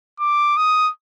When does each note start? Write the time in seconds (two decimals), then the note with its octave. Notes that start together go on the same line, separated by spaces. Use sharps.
0.20 D6
0.57 D#6